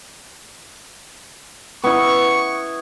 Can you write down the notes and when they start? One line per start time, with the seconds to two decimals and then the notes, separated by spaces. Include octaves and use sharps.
1.84 B3 E4 C#6